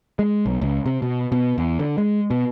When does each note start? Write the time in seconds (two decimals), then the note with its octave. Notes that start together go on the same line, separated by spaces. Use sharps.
0.19 G#3
0.46 B1
0.61 C#2
0.86 C3
1.02 B2
1.32 B2
1.58 E2
1.79 D3
1.98 G#3
2.31 B2